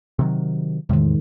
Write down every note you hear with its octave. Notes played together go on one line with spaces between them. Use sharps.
C3 D#3 F#3
E2 A2 C3 D#3 G#3